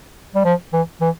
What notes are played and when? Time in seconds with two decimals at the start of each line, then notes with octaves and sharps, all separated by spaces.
0.35 G3
0.45 F3
0.73 E3
1.01 E3